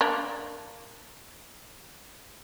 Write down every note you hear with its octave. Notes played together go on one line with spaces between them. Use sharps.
A#3 D4